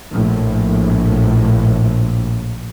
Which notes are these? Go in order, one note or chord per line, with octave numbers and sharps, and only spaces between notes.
A#1 A2